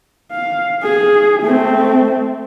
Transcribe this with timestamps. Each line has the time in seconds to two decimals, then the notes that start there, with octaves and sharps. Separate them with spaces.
0.32 F5
0.83 G#4
1.42 A3 C4